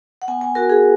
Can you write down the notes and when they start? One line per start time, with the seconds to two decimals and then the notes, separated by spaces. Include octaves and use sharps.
0.22 F#5
0.28 B3 G#5
0.41 G#5
0.55 F#4 A#4
0.70 G#4